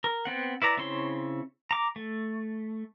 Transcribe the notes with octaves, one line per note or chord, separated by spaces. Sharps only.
A#4
B3 C4 F#5
E4 B4 D5 A#5
C#3 C4 E4 C#5 C6
A#5 D6
A3